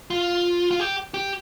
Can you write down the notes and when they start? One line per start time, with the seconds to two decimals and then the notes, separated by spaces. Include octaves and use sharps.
0.10 F4
0.71 F4
0.80 G4
1.14 G4